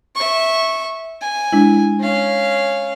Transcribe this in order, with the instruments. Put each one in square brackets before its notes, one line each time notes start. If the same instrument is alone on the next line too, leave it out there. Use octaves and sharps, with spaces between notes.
[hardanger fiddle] E5 C#6
G#5
[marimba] G#3 D4 E4
[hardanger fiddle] C#4 F5